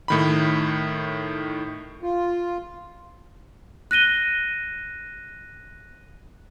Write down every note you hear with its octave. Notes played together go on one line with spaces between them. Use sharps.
A2 D#3 B5
F4
F#6 A#6 D#7 G7